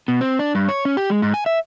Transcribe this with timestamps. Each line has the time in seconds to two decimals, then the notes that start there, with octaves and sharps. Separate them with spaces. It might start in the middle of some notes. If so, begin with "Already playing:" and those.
0.08 B2
0.21 C4
0.39 D4
0.55 G2
0.69 C#5
0.85 C#4
0.97 G4
1.10 G#3
1.22 G#2
1.34 G#5
1.46 E5